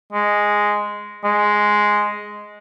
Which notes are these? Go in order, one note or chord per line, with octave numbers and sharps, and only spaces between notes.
G#3
G#3